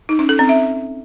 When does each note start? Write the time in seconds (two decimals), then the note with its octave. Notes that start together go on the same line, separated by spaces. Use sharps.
0.09 D#4
0.19 C#4
0.29 A4
0.39 C4
0.49 E5